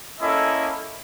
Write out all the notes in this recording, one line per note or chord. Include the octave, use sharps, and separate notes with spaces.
A#3 C#4 E4 A4 D#5